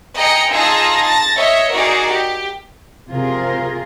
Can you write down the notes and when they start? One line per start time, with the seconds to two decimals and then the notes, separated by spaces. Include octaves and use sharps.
0.18 G#4 D#5 G5 A#5 C#7
0.52 D#4 F4 G#4 A5 E6 A#6
1.03 A5 A6 A#6
1.36 C#5 D#5 E5
1.74 D#4 F#4 G#4 A#4 D5
2.11 G4
3.09 C3 F4 G#4 A#4